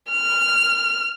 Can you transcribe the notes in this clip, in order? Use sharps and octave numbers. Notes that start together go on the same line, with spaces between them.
F6